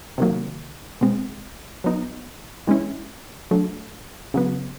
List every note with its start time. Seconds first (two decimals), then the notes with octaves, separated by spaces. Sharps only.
0.18 C3 D#3 F#3 A#3
1.01 B2 G#3 C4
1.84 F#3 B3 D#4
2.67 E3 G#3 C#4 E4
3.51 F#3 A3 D4
4.34 C#3 F#3 B3